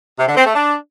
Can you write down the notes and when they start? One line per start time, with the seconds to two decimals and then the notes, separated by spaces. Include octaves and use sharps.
0.19 C3
0.28 D3
0.37 C4
0.46 A3
0.55 D4